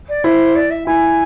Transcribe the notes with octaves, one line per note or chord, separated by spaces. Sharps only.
D5
E4 C5
D5
E5
E4 G#5